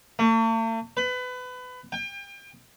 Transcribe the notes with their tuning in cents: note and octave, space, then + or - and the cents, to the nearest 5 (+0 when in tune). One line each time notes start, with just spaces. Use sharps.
A3 +45
B4 +25
G5 +35